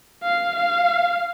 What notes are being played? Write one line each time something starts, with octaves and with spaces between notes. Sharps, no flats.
F5
F5